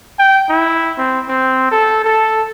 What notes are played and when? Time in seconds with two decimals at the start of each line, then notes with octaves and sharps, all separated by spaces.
0.19 G5
0.49 E4
0.98 C4
1.29 C4
1.72 A4
2.05 A4